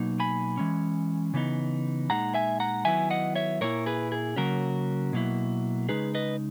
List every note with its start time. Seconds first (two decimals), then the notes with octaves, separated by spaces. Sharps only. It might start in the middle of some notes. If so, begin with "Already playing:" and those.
Already playing: B2 F#3 A#3 D#4
0.20 G#5 B5
0.57 E3 G#3 C#4
1.34 C#3 E3 B3 D#4
2.09 A#2 G#3 D#4 F#5 A#5
2.34 E5 G#5
2.60 F#5 A#5
2.85 D#3 F#3 B3 E4 E5 G#5
3.10 D#5 F#5
3.35 C#5 E5
3.61 A#2 A#3 E4 A#4 C#5
3.86 G#4 B4
4.12 G#4
4.36 C#3 F#3 A#3 C#4 F#4 A#4
5.13 B2 F#3 A#3 E4
5.89 C#3 G#3 D#4 G#4 B4
6.15 B4 D#5